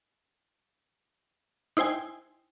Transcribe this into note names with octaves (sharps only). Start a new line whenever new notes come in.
D#4 E4 C5 G5 G#5